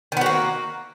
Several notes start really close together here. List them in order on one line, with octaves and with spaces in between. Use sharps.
D#3 B3 F#4 A#3